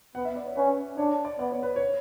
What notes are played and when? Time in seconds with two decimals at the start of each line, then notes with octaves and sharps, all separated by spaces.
0.15 B3 F#5
0.25 E5
0.36 D5
0.46 C#5
0.57 C#4 B4
0.97 D4 C#5
1.25 D5
1.39 B3 D5
1.52 C#5
1.63 B4
1.76 C#5